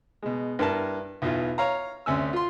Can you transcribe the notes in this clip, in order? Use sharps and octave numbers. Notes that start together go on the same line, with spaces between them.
B2 G#3
G2 E4 A#4 A5
B1 E2 F4
C#5 F5 A#5
D2 C3 C#4 G#5 E6
F4 C6